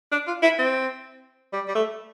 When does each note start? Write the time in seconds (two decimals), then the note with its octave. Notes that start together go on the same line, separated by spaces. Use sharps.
0.12 D4
0.27 F4
0.43 E4
0.59 C4
1.53 G3
1.68 G3
1.75 A3